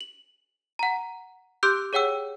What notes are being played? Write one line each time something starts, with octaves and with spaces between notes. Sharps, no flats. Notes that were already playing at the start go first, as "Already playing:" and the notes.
F#7
F#5 A#5
G4 C6 D6 E6 F#6 G6
G#4 C#5 F#5 G5 E6